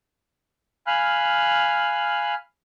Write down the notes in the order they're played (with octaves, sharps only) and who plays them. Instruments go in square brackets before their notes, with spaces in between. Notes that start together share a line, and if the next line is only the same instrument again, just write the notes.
[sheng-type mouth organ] F5 G#5 B5 F6 F#6